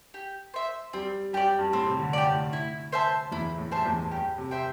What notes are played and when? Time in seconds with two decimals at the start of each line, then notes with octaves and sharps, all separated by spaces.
0.14 G4
0.54 C5 E5
0.93 G3 C4
1.33 G3 G4 D5
1.59 G2
1.72 A2 C4
1.86 C3
1.99 D3
2.13 G4 D5
2.26 A2
2.53 E4
2.92 C5 E5 A5
3.32 E2 E4
3.58 A2
3.71 G2 C5 E5 A5
3.85 E2
4.00 A2
4.11 G2 G4
4.38 C3
4.51 C5 E5 G5